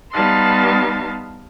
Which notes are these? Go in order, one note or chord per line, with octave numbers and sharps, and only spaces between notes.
G3 B3 D#4 F5 A5 C6